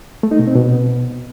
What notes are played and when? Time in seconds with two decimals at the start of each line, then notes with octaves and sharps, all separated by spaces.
0.23 A3
0.31 D#4
0.39 B2
0.47 C4
0.55 B2